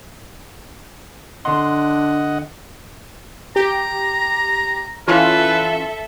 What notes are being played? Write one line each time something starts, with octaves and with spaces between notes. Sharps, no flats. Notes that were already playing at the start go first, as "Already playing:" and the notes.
D3 D4 D#5 F#5 C6
G4 A#5
E3 C#4 F4 A4 B4 E5